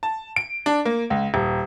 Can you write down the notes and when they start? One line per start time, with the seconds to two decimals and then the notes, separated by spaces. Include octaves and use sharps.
0.03 A5
0.36 D7
0.66 D4
0.85 A#3
1.10 C#2
1.34 D#1